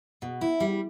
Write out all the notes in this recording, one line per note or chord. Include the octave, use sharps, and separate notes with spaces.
B2
E4
G3